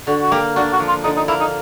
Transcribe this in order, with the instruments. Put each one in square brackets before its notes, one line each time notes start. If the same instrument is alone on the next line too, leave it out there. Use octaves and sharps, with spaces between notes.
[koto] D3 [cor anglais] F#4
[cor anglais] F#4
[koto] A#3 [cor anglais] G4
[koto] D4 [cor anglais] F#4
[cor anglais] F#4
[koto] F3
[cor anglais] F4
[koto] D3 [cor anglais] D#4
[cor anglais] D#4
[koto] A#3 [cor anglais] E4
[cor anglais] D#4